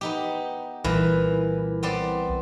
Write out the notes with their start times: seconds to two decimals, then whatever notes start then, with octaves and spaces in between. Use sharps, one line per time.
0.01 B3 D#4 G4
0.84 C2 A#2 E3 B4
1.83 B3 C4 D5